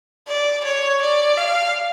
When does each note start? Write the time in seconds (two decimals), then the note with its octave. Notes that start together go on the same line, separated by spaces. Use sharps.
0.28 D5
0.64 C#5
1.01 D5
1.37 F5